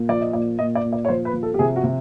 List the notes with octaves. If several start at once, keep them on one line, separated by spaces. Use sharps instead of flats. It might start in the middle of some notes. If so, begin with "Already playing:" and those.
Already playing: A#2
F3 D5
D#5
A#2 D5
A#2 D#5
D5
A#2
D5
C#5
F3 C5
B4
F3
A4
G4
C3 G#4
F#4
C3